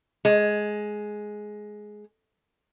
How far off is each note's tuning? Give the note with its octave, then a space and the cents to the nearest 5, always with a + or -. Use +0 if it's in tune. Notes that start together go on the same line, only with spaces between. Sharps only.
G#3 +10